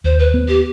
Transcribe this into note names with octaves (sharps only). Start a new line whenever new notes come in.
D#2 C5
B4
B3
G4